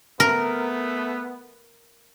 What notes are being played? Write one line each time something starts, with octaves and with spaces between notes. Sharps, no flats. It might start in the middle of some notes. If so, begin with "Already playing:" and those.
A3 B3 A#4